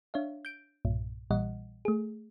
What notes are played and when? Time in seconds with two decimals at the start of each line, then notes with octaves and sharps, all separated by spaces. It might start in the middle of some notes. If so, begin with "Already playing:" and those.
0.14 D4 C#5 E5 F5
0.45 G6 D7
0.85 B1 G2 A#2
1.31 A#1 A#2 E3 G3 D#5 F#5
1.85 A3 G#4